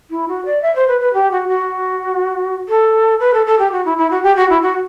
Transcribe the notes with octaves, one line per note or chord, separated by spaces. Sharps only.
E4
F#4
D5
E5
C5
B4
B4
G4
F#4
F#4
A4
B4
A4
A4
G4
F#4
E4
E4
F#4
G4
F#4
E4
F#4